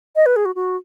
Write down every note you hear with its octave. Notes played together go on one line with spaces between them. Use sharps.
D#5
B4
G#4
F#4
F#4